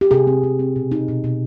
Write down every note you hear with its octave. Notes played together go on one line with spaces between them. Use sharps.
G4
C3 G#4
C4
C3
C4
B2
D#4
B2
B2